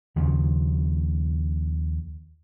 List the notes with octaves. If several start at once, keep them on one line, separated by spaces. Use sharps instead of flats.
D#2 C#3 F3